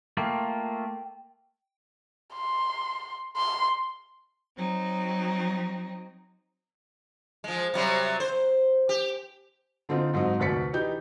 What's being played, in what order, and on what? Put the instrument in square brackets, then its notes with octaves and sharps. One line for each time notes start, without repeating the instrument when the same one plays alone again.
[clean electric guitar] A3 A#3 F4 [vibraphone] G5
[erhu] C6
C6
[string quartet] F#3 C4 D#4
[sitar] F3 G#3
C3 F#3 G3
C5
G4
[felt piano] D3 C4 D#4 F4
G#2 F#3 C4 D#4
F1 D2 D5 A6 B6 C#7
E3 D#4 G4 G6